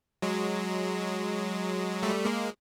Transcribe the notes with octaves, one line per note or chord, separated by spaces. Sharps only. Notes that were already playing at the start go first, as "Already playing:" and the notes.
F#3 G#3
G3 A3
G#3 A#3